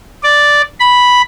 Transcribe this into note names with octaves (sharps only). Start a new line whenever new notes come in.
D5
B5